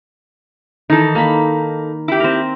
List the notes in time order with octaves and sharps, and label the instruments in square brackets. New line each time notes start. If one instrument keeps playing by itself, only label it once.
[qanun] D#3 E3 [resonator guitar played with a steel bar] D#4 A4
[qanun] A#3 B5
[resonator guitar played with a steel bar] E4 G4
[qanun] C4 A#4